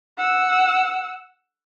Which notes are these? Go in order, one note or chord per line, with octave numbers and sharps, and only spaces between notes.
F#5 E6